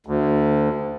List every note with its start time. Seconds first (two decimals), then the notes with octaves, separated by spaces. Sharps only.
0.06 D2